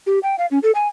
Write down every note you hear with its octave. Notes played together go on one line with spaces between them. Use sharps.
G4
G5
F5
C#4
A4
G#5